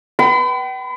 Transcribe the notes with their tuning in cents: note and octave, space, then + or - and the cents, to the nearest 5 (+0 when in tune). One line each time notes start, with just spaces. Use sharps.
B4 -20 G5 -40 B5 +40